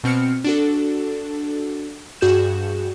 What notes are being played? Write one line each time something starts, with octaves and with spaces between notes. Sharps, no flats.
B2 C4 F6 C#7
D4 F#4 A4
G2 F#4 G#4 G6 E7